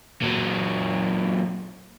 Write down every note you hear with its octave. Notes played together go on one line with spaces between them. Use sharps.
A#2 F#3